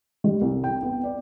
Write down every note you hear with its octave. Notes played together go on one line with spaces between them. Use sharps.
G3
C2
G5
B3
D5